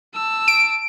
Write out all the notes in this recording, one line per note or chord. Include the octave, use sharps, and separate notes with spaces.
A5 E6
D7